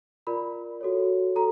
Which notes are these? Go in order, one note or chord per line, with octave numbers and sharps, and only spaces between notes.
F4 A#4 D5 B5
F#4 A4 C#5
F#4 A4 A#5